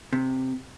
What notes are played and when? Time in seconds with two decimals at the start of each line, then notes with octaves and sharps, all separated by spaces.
0.13 C3